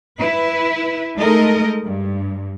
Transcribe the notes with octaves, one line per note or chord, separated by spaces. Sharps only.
E4 B4
G#3 A3 D#4 A4 A#4 D#5
G2